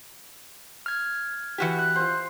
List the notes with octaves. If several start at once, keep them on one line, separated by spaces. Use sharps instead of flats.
F6 G#6
E3 F#4 G4
F#6
F4 C5